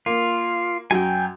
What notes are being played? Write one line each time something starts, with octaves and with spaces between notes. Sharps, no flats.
A#3 F4
F#2 F#3 G5 G#5